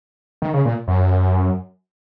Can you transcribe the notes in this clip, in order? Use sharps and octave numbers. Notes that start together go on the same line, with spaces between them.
D#3
C#3
A#2
F#2